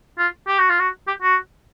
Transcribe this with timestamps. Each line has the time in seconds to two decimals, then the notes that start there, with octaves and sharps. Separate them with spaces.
0.18 F4
0.47 G4
0.59 F#4
0.69 F4
0.80 F#4
1.07 G4
1.22 F#4